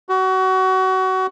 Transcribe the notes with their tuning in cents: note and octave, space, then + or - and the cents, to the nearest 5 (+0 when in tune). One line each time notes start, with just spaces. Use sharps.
F#4 +25